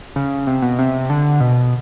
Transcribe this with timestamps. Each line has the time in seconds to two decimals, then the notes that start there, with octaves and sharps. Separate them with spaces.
0.16 C#3
0.47 C3
0.62 B2
0.79 C3
1.10 D3
1.40 B2